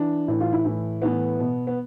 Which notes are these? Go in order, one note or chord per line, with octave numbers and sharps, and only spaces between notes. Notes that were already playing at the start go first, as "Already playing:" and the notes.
Already playing: E3 D4
A2 E3 E4
F4
E4
A2 E3
A2 E3 B3
B2
B3